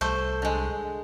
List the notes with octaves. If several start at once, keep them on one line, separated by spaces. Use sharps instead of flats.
C2 A3 C5
D3 G#3